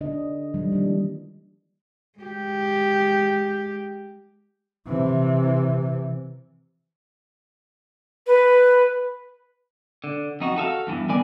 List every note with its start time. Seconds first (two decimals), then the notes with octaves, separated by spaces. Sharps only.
0.01 D3 D4 D#5
0.54 D#3 F3 G3
0.72 E3 G#3 A#3 D4
2.19 G#3 G4
4.87 C3 E3
8.27 B4
10.04 D3
10.40 F2 D#4 F#4
10.56 F#4 A4 E5 F5
10.87 E2 G2 E3
11.09 D#3 B3 A#4 D5 G#5